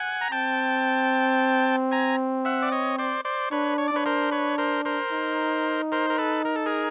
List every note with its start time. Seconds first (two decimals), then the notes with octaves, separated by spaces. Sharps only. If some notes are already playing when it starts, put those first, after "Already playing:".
Already playing: F#5 G#5
0.21 A#5
0.32 C4 G5 A5
1.92 G#5 A#5
2.45 E5 F#5
2.62 D5
2.72 C#5 D#5
2.98 C5 D5
3.25 C5 D5
3.51 D4 B4 C#5
3.78 C#5
3.88 D5
3.92 D4 B4 C#5
4.06 A#4 C5
4.31 B4 C#5
4.58 A#4 C5
4.85 A#4 C5
5.12 D#4
5.92 A#4 C5
6.10 A#4
6.18 A4 B4
6.45 A#4
6.56 A4
6.66 G#4 A#4